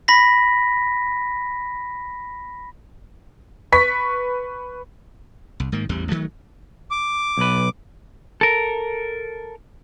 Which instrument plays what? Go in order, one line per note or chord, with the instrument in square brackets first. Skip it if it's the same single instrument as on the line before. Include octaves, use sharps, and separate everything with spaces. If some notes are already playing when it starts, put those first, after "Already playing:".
[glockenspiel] B5 A#6 B6
[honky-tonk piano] B4 C#6 B6
[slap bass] C2
G#2 D#3 A#3
A1 E2 G3
D#3 F3 F#3 A3
[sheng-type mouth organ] D6
[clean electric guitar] B1 B4
A4 A#4